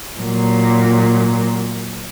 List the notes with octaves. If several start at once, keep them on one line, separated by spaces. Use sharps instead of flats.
A#2 F#3